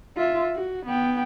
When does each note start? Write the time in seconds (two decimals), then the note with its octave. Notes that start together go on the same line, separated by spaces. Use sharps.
0.17 F4 E5
0.55 F#4
0.86 B3 G5